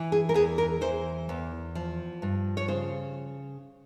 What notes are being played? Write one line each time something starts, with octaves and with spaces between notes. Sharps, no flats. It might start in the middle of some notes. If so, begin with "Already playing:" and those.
Already playing: E3
G#4
A#4
E2 G#4
A#4
E3 C5
E2
F3
G2
C#5
C#3 C5